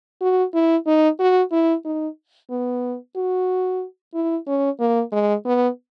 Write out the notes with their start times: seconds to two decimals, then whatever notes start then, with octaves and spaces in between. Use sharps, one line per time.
0.21 F#4
0.54 E4
0.86 D#4
1.19 F#4
1.52 E4
1.85 D#4
2.50 B3
3.16 F#4
4.14 E4
4.47 C#4
4.79 A#3
5.12 G#3
5.45 B3